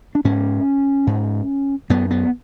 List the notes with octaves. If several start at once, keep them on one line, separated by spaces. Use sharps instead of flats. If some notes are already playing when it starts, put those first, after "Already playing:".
D4
G#2 C#4
G#2
F#2 B3
B3